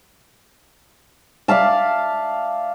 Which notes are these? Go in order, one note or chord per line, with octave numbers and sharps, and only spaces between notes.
D5 E5 F5 A5